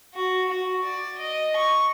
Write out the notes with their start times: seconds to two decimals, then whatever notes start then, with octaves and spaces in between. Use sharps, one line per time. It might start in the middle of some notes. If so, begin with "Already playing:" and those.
0.14 F#4
0.49 F#4
0.84 D5
1.19 D#5
1.56 C#6